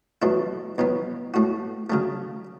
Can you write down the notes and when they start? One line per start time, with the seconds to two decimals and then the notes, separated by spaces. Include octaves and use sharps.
0.22 E2 B2 F#3 A3 E4
0.78 E2 B2 F#3 B3
1.34 A2 A3 F#4
1.90 C#3 F#3 A3